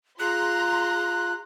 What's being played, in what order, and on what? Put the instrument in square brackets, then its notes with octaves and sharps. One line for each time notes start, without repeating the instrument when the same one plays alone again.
[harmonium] F4 [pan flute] G#4 [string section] A#5 C6 [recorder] F#6